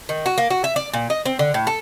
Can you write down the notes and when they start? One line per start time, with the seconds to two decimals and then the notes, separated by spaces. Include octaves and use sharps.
0.09 D#3
0.26 F#4
0.38 A#3
0.50 F#4
0.64 E5
0.76 D5
0.93 A#2
1.10 D#5
1.26 C4
1.39 D3
1.54 A2
1.67 A4